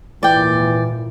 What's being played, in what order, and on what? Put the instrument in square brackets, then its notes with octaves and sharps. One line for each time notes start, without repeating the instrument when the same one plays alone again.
[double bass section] G#1 D#2 A#2 [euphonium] E3 [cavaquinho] D5 G5